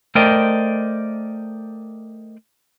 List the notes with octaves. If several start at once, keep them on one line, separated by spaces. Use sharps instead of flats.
A3 A#4 C5 D5 D#5 G5